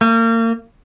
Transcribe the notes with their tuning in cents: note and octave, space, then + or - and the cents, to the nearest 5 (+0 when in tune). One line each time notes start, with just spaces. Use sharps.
A#3 -35